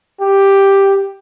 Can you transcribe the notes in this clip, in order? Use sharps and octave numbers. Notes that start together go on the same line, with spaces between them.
G4